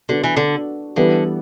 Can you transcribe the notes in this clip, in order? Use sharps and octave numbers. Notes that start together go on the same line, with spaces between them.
D3 B3 D4 F#4
E3
D3
D3 E3 G3 B3